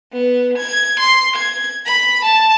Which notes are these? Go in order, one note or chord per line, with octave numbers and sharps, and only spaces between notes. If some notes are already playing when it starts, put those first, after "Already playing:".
B3
G#6
C6
G#6
B5
A5